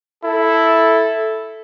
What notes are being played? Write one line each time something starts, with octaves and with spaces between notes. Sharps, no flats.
E4 A4